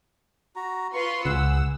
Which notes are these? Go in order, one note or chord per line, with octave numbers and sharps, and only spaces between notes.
F#4 A#5
F4 B4 C6 C#6
C#2 G#4 F#5 E6